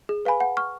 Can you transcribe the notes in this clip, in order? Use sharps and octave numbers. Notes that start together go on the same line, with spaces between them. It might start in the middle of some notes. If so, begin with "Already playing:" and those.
G#4
B4 F5 G#5 B5
F#5
C#6 F6